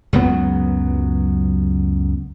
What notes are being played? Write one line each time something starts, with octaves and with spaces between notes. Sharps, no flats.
C#2 F#2 F#3 B3